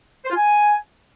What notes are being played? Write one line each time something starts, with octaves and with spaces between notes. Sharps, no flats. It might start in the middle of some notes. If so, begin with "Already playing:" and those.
C5
F4
G#5